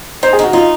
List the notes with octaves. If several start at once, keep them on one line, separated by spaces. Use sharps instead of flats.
D#3 C5
G#4
D#3 F#4
D#4 F4